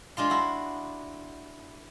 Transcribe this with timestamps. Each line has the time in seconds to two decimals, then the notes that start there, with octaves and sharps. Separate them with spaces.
0.17 G#3 D4 F4 C6
0.30 E4 F#4